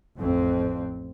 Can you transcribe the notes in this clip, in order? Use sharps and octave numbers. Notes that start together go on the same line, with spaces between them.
A1 F2 C4